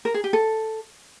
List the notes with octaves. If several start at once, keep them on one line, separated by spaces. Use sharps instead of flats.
A#4
G#4
G4
A4